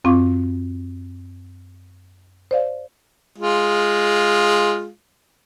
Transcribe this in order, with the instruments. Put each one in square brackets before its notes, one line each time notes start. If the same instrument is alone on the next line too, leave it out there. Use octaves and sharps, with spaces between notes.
[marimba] F#2 C4 F4 F5 C#6 D6
C5 D5 F5
[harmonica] G#3 F4